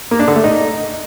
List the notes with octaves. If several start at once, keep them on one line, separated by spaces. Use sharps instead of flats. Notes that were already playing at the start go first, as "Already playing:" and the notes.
A#3
D4
D3
A3
D#4